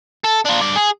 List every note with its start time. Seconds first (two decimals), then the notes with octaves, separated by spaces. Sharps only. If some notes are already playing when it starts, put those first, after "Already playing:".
0.24 A4
0.45 D4 F4
0.61 G2 D5
0.76 G#4